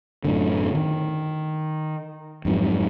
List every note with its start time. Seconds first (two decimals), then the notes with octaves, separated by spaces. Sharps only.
0.25 F#2 A2 D3
0.75 D#3
2.45 F2 G#2 F#3